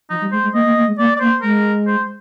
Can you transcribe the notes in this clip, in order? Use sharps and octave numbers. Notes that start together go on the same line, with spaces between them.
F3 D#4
G3
G#3 C5
G#3
A#3 D#5
A#3
A#3
G#3
A#3 D5
D5
A#3 C5
G#3 A#4
C5